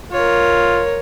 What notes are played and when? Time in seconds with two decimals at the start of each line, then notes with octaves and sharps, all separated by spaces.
0.12 F4 A#4 C#5